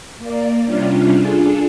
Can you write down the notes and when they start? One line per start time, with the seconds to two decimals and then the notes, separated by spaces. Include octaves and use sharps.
0.19 A#3 D5
0.64 C3 G3 C#4 D4 F4
1.15 D4 F4 G#4 A4